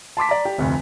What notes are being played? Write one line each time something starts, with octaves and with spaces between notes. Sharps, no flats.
A5 C6 D6 B6
D5 A#5
G4
F1 D2